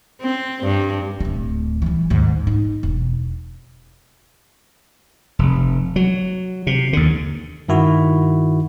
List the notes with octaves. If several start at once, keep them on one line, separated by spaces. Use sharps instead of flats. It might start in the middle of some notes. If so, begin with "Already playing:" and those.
C4
G2
D1 A3
E3 G3
D#2 G#2
D#4
E1
F1
F#3
C3
D#2 D3
G2 D#3 E4 F#4